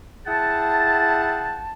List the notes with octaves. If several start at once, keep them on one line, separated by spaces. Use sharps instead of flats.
E4 G#4 F#5 G5 A5